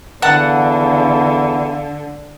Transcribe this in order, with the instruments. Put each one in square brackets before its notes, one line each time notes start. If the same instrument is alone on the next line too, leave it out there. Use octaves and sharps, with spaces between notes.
[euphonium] E2 [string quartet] D3 [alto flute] F5 [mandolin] F#5 A5 F#6